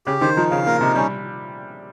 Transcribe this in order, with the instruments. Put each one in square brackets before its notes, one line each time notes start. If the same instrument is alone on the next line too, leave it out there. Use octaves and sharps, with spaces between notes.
[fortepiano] C#3 [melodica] G4
[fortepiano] D#3 [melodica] C5
[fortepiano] F3 [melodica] D#4
[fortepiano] C#3 [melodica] F5
[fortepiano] A#2 [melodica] A#4
[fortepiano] C3 [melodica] D#4
[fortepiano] G3 [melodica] C#4